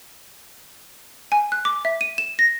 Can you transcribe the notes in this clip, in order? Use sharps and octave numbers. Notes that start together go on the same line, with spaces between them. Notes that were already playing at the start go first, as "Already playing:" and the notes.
G#5
F#6
D6
E5
D#7
E7
A#6